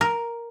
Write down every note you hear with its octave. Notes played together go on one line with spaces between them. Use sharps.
A#4